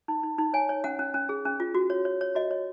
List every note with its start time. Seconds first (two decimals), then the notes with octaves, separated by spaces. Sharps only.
0.08 D#4
0.23 D#4
0.38 D#4
0.53 C#5 G#5
0.69 C#5
0.84 C#4 F#5
0.99 C#4
1.14 C#4
1.29 G#4
1.45 C#4
1.60 F4
1.75 F#4
1.90 C#5
2.05 C#5
2.21 C#5
2.35 F#4 D#5
2.51 C#5